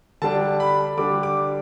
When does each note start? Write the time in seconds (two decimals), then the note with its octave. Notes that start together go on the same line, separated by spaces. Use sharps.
0.22 D3 G3 D4 A5
0.60 B5
0.97 D3 G3 D4 D6
1.23 D6